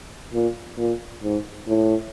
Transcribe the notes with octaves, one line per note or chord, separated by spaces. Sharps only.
A#2
A#2
G#2
A2